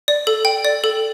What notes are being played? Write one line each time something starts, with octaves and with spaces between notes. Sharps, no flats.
D5
A4
G5
D5
A4